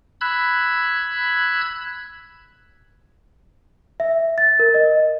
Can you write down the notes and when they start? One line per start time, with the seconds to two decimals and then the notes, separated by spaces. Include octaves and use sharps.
0.21 B5 E6 F#6 G#6
4.00 E5
4.38 A6
4.59 A#4
4.74 D#5